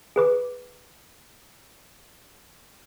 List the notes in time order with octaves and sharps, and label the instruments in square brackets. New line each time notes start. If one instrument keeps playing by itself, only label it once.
[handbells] G#4 B4 D6